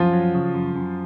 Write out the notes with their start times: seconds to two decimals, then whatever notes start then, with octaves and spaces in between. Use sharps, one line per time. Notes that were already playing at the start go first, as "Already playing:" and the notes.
Already playing: F#2 F3 F4
0.13 F#3
0.34 C#3
0.54 F#2
0.76 F#2